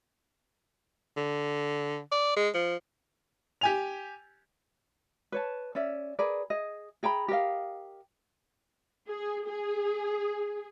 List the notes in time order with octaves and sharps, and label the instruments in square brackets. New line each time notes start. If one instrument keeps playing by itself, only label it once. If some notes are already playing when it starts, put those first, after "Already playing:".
[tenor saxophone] D3
D5
G#3
F3
[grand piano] G4 G#5 F7
[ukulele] B4 C#5 A5
C#4 D5 E5
G#4 A#4 B4 D5
G#4 D#5
G#4 G5 A#5 B5
G4 A#4 D#5 F5
[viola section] G#4
G#4